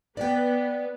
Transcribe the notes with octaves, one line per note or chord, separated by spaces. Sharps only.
B3 D5 G5